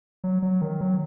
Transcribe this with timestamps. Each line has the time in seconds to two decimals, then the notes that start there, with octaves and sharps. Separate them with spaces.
0.24 F#3
0.42 F#3
0.61 D#3
0.81 F#3